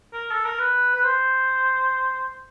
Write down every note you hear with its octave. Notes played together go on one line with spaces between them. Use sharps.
A#4
A4
A#4
B4
B4
C5